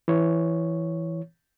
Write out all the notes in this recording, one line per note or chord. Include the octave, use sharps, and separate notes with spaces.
E3 C#5